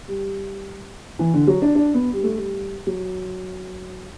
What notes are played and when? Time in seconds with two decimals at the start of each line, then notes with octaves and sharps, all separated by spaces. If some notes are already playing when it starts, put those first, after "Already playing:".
0.08 G3
1.19 E3
1.34 D3
1.47 F#3
1.62 D4
1.75 D4
1.94 B3
2.13 G3
2.23 A3
2.36 G3
2.87 F#3